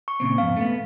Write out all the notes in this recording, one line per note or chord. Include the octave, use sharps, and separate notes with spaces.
C#6
A#2 C#3 C4
F2 G#2 B2 F5
A3 B3